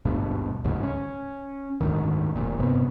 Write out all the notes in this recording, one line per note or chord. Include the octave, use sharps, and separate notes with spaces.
G#1 D2 G2 B2
G1 D2 G#2 C#3
C#4
F#1 D2 G#2 D#3
F1 A#2
G1 G2 C3 B3